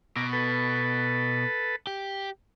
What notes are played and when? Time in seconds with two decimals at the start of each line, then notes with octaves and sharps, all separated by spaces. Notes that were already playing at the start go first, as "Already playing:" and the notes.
0.16 B2 A#5 D6
0.33 A4 B4
1.87 G4